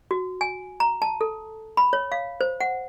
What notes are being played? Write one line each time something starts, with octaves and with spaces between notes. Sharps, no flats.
F#4
G#5
A#5
A5
A4
B5
C#5
F5
C5
F#5